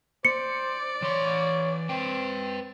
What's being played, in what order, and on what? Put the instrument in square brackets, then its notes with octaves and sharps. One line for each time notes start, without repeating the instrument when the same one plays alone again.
[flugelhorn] C5 [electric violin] D5 [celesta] C#7
[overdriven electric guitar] E3 C6 [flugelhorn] C#5
[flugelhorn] C4 [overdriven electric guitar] B4 G5